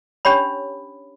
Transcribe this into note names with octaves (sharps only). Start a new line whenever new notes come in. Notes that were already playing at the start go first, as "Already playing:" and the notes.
C#4 D4 G4 C#5 B5